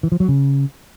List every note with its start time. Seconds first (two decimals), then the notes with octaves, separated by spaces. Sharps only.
0.03 E3
0.12 F3
0.20 F#3
0.28 C#3